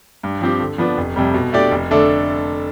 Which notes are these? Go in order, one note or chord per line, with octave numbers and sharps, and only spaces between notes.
G2
F3 C4 G4
D3
F3 B3 D4
F1
F2 C3 G3
B2
A3 D4 G4 D5
F1
D3 A3 D4